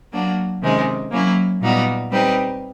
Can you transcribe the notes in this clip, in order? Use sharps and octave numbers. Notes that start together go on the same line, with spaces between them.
F#3 A#3 D4 F#4
C3 D#3 G#3 C#4
F#3 A#3 C#4 E4
A#2 G3 B3 D#4 F#4
G3 C4 D#4 G4 B4